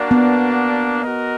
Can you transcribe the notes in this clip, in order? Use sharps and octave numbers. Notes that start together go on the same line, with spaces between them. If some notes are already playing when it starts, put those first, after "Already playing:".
Already playing: A#3 D4 F#4
B3
F#4 A#4 D#5